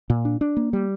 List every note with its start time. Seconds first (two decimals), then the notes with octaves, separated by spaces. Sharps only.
0.10 A#2
0.25 D4
0.41 D4
0.57 A#3
0.73 G3